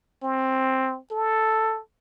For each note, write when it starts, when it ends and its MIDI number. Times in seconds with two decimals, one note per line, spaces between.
0.23 0.99 60
1.11 1.80 69